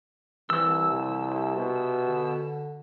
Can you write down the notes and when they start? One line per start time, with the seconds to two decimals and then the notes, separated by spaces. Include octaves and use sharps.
0.50 C2 E3 E6
0.91 C3
1.55 B2
2.07 D3